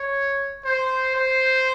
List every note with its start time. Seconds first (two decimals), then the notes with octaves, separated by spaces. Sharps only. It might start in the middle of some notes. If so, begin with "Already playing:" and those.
Already playing: C#5
0.64 C5
1.16 C5